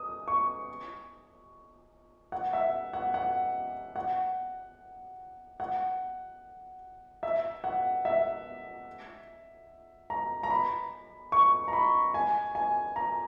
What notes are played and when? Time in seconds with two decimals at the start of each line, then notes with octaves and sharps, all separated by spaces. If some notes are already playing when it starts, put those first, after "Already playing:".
Already playing: D#6
0.28 C#6
2.32 F#5
2.53 E5
2.93 F#5
3.14 F#5
3.96 F#5
5.60 F#5
7.23 E5
7.64 F#5
8.05 E5
10.10 A#5
10.43 A#5
10.50 B5
11.32 C#6
11.68 A#5
11.73 B5
12.14 G#5
12.55 G#5
12.96 A#5